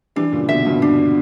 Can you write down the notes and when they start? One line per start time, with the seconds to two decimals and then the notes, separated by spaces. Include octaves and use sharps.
0.16 E3 G3 D4
0.32 A#2 C#3
0.49 B2 D3 E5
0.65 G2 B2
0.82 D4